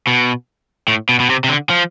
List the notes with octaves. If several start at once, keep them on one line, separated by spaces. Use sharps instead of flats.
B2
A2
B2
B2
C3
C3
D3
F3